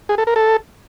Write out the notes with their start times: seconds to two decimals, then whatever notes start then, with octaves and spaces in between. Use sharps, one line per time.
0.09 G#4
0.18 A4
0.27 A#4
0.36 A4